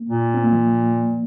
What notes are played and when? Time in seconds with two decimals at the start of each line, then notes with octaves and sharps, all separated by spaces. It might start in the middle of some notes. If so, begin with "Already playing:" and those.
Already playing: A#3
0.09 A#2
0.34 C4
0.44 A#3
0.52 F3